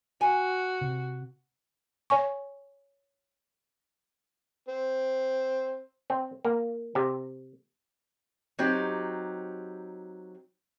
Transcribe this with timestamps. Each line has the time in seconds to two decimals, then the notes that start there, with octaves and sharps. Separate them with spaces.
0.21 F#4 G#5
0.81 C3
2.10 C#5 G#5 C#6
4.68 C4
6.10 C4
6.45 A#3
6.95 C3
8.59 F#3 C4 D#4 G4